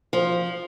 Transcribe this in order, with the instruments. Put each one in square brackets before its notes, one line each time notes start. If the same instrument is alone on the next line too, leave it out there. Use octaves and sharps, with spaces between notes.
[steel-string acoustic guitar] F3